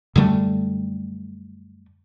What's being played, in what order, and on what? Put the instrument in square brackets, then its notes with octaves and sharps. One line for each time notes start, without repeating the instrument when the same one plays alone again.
[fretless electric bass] F#2 D3 G3 A3